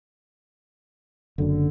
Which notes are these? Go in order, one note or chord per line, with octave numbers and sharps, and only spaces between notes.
F#1 F#2 D3